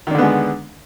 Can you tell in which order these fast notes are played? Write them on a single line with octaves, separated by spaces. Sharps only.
D#3 D4 D3 B3 G#3